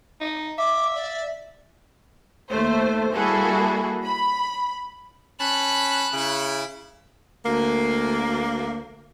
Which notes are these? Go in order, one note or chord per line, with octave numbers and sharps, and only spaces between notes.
D#4
E5 D6
D5
D#2 A3 C5
G3 A#3 E4 F#4 G#4 A4
B5
C#4 A5 B5 F#6
C#3 E4
D2 A#3